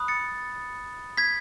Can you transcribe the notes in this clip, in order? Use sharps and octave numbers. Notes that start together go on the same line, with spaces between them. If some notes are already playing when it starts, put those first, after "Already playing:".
Already playing: B5 D#6 F#6
A6 C#7
G#6 B6